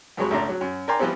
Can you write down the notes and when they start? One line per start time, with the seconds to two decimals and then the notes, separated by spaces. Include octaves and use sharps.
0.17 F2 C3 F#3 G#3 C#5 B5
0.30 G#1 C#2 A3 D4 A#5
0.49 F#3
0.61 F#2
0.88 A#4 D5 G5 G#5 A#5 C6
0.99 E3 F3 G3 B3 C4